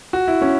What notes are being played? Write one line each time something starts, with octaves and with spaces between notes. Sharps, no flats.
F#4
E4
C#4